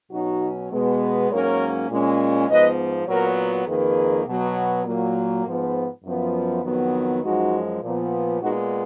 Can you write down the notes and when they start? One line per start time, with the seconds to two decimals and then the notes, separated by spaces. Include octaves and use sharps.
0.11 B2 F#3 C#4 D#4 F#4
0.71 B2 G#3 B3
1.30 G#2 F#3 A#3 C#4 A#4 C#5
1.89 A#2 G#3 C#4
2.48 G#2 F3 B3 B4 D#5
3.07 A#2 F#3 B3 A#4 C#5
3.67 F2 D#3 A#3 G#4 B4
4.27 B2 F#3 B3
4.85 A#2 F#3 A#3
5.45 G#2 F3 B3
6.04 F#2 F3 B3
6.63 F2 D#3 F#3 B3
7.22 F#2 F3 G#3 D#4 F#4
7.82 A#2 F3 B3
8.41 A#2 G#3 B3 D#4 F#4